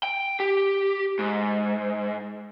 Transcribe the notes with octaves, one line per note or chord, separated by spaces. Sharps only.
G5
G4
G#2